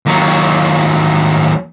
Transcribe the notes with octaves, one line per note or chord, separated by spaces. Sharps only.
D#2 F#3